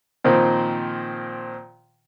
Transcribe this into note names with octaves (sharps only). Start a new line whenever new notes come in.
A#2 D#3 F3 C4